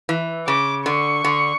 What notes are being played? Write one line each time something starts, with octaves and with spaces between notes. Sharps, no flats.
E3
C#3 D6
D3 C#6
D3